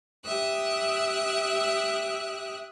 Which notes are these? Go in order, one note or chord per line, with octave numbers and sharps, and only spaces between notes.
G4 E5 D#6 E6 F#6